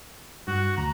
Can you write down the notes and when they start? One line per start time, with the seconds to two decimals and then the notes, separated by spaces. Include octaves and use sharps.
0.48 G2 F#4
0.77 D2 A#5